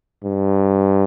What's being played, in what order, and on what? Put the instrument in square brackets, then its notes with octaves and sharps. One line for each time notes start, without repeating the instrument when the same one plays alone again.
[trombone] G2